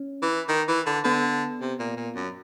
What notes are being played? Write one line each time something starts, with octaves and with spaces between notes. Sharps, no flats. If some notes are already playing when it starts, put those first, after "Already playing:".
Already playing: C#4
E3
D#3
E3
D3
D3 B3
C3
A#2
A#2
F#2